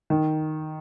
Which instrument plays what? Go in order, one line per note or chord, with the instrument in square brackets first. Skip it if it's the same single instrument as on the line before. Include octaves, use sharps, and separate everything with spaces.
[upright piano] D#3